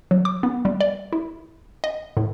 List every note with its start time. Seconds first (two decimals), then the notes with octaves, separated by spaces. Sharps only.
0.11 F#3
0.25 D6
0.43 B3
0.65 G3
0.81 D5
1.13 E4
1.84 D#5
2.17 A2